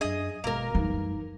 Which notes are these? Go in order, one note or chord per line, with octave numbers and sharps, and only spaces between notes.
F#2 D4 G#4 D#5
G#1 B2 G#3 A#3 A#4
F#2 E3 G3 A3 D#4